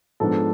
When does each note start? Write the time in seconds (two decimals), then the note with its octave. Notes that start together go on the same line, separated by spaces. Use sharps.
0.20 G#2 F3 B3 D4 A4